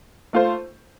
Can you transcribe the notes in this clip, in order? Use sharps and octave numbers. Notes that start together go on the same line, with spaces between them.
A3 F4 C5